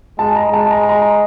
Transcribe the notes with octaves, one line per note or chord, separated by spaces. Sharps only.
G#3 A5
A#5
G#3 A5
A#5
A#5